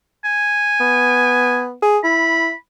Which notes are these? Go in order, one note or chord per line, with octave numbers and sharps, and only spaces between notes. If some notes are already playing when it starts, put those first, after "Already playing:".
G#5
B3
G#4
E4 B5